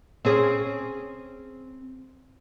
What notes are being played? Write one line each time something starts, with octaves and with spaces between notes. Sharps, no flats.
C4 C#4 G#4